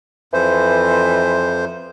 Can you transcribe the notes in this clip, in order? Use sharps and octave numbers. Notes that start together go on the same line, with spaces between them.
F2 E3 C5